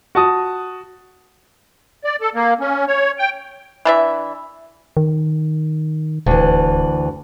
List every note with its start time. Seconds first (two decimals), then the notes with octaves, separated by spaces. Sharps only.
0.15 F#4 A5 D#6
2.04 D5
2.21 A4
2.35 A#3
2.60 C#4
2.88 C#5
3.19 G5
3.85 E3 D4 E5
4.97 D#3
6.26 D#1 D2 E3